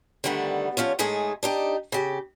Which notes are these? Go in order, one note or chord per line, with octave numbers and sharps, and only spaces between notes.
D3 D#3 G3 A3 B3
F3 C#4 F4 C#5
A2 G#3 A3 D#4 G#4 G#5
D4 D#4 G4
C#3 G4